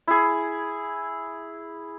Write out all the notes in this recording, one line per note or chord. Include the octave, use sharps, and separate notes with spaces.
E4 G#4